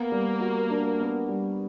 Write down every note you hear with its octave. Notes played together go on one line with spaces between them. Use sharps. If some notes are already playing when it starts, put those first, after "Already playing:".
Already playing: A#3 B3
G3
F#4
D4
B3
G3